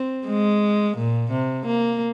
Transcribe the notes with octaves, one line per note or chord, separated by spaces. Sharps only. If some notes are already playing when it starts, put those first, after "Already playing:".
Already playing: C4
G#3
A#2
C3
A#3